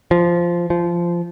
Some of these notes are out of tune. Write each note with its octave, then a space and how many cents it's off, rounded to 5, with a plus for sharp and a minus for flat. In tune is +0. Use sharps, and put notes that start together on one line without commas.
F3 -10
F3 -15